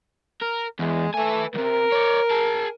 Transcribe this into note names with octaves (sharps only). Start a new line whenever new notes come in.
A#4
E2 G#3
A3 B4 G#5
C#2 C3 A#4
C#5 D5
G#4 A5